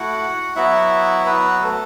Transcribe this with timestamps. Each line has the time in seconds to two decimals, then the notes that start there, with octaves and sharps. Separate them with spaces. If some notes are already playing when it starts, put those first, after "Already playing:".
Already playing: A3 E4 F#4 F#5
0.56 F#3 B3 E4 F#4 E5
1.26 B3 B4
1.62 A3 A4